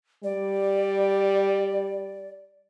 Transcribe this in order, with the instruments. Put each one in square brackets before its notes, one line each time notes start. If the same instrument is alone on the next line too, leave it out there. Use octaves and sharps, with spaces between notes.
[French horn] G3 [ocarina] D5